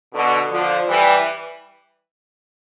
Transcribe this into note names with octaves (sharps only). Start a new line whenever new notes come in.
B2 D3
D3 F3
E3 G3